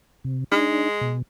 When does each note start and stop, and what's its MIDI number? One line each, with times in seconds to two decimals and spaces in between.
0.24 0.44 48
0.52 1.15 56
0.52 0.88 62
0.52 0.88 63
1.01 1.22 47